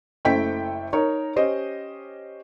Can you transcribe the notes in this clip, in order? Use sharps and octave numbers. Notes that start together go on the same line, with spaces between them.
F#1 A3 E4 C5 G5 B6
D#4 A#4 C#5
C#4 G4 C5 D#5